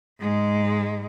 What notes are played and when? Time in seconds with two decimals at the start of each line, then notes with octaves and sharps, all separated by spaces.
0.21 G#2 G#3